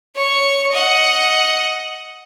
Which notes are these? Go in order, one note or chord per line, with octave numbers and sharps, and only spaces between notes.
C#5 C#6
D#5 F#5